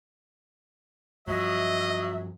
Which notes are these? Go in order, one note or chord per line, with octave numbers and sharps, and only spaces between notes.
G2 F3 F#3 D#5 E5